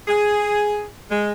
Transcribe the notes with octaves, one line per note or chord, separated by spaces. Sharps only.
G#4
G#3